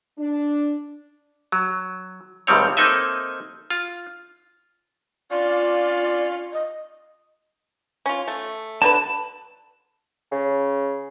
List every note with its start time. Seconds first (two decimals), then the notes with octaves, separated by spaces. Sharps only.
0.18 D4
1.52 F#3
2.47 C#2 A2 D#3 G3 C4 C#5
2.77 A#3 C4 D#4 A4 D#5 E5
3.70 F4
5.31 C#4 D4 F4 D5
6.53 D#5
8.06 C#4 F4
8.28 A3
8.82 D3 F#3 B4 A5
10.32 C#3